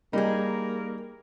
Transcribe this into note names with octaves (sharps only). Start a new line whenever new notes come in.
G3 A#3 D#4 G#4